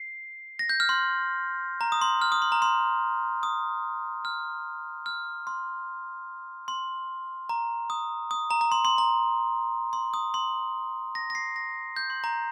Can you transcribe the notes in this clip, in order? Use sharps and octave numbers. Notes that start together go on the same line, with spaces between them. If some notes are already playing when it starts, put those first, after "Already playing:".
Already playing: C7
A#6
G6
F6
C6
A#5
D#6
C6
F6
D#6
C6
A#5
C6
D#6
F6
F6
C6
C6
A#5
D#6
D#6
A#5
A#5
C6
C6
A#5
C6
D#6
C6
A#6
A#6
C7
A#6
G6
C6
A#5